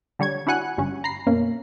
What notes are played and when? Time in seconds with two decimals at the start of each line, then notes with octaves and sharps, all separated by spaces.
0.19 D3 G3 C#5 G#6
0.47 D4 E4 F#4 F#5 G#5 F#6
0.78 G1 G2 C#4
1.04 A#5 B5 C7
1.26 F#2 B2 A#3 C#4